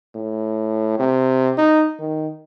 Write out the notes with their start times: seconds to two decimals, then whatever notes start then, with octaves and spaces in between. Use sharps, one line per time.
0.15 A2
0.99 C3
1.58 D#4
2.00 D#3